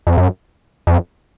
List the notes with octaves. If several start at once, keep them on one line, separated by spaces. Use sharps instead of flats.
F2
F#2
F2